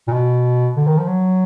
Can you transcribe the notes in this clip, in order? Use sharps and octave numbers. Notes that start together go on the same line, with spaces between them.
A#2
B2
D3
D#3
F3
F#3